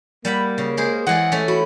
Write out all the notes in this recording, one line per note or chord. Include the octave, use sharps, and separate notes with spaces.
G3 A#3 F#5 B5
C#3
G#3 G#4 C5
E3 G#3 D5 F#5
A3 C#4
E4 F#4